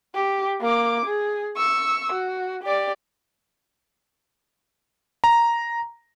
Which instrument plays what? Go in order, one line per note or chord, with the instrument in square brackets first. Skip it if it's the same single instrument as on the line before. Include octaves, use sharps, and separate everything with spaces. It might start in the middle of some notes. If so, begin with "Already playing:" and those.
[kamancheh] G4
A#3 D6
G#4
C#6 E6
F#4
G4 D5
[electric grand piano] A#5